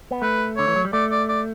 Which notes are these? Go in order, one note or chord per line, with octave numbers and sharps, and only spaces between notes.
B3
A3 B4
D3 C#5
E3
F#3
G3
A3 D5
D5
D5